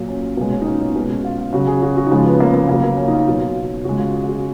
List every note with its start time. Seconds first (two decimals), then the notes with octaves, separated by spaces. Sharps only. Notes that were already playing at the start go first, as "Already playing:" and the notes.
Already playing: A#2 F#3 F4
0.09 C#4
0.37 B2 G#3 A#3
0.53 C#4
0.61 D#4
0.66 C#4
0.81 D#4
0.96 B2 G#3 C#4
1.25 F4
1.38 F4
1.53 C#3 F#3 F#4
1.67 G#4
1.82 F#4
1.97 F#4
2.06 D#4
2.11 C#3 F3 G#3 F4
2.26 B3
2.40 A#3
2.54 A#3
2.69 C#3 F#3 A#3
2.84 A#3
2.98 C#4
3.08 D#4
3.13 F4
3.28 B2 F#3
3.84 C#3 G#3 F#4
3.99 F4
4.14 G#4
4.24 F4
4.29 F#4